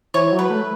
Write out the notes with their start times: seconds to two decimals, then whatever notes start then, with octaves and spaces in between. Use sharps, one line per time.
0.14 E3 C#5
0.32 F#3
0.39 B4
0.50 A3